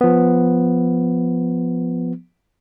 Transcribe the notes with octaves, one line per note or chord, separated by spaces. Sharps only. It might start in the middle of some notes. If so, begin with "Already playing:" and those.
F3 B3